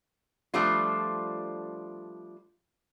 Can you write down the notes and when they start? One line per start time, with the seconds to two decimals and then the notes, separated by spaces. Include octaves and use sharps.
0.54 F3 G3 A3 D4 F4